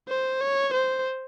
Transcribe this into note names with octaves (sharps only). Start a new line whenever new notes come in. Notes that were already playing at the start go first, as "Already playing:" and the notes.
C5
C#5
C5